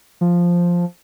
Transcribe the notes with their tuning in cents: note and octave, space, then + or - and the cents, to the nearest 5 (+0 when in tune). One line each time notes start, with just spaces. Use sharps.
F3 +0